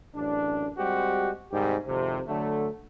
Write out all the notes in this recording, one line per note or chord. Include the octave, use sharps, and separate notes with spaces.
A1 F#2 D4
G3 G#3 C4 F#4 G4
G#2 C3 D#3 G3 G4
G#1 F2 C3
D3 F#3 A3